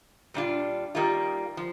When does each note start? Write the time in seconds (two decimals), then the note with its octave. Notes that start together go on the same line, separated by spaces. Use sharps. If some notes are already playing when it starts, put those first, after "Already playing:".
0.34 A#2 G3 D4 F4
0.95 D#3 G3 A#3 F4
1.57 F3